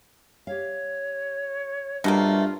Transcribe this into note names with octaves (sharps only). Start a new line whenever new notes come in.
G4 C#5 F5
G2 B2 G3 A3 A#3 F4 F#4 C#5